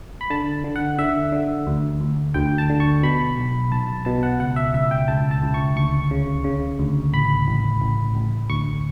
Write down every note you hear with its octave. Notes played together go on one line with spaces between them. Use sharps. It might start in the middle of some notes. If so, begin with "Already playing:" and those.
B5
D3 A5
D3
F#5
D3 E5
D3
D2
D2
D2 G5
A5
D3
C#6
B2 B5
B1
B1 A5
B2 A5
F#5
C#2 F#5
E5
C#2 E5
G5
C#2 A5
A5
C#2
C#6
D2 C#6
C#3
C#3
D2
A1 B5
A1
A1
A1
D2 C#6